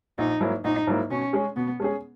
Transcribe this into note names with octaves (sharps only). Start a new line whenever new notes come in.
A#1 D#4
G#2 F#3 A#3 E4
A#1 D#4
G#2 F#3 A#3 E4
B2 C#4
G#3 C#4 G#4
B2 B3
G#3 C#4 G#4